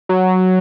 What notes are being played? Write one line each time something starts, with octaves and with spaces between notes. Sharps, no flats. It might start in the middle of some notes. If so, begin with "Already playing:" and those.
F#3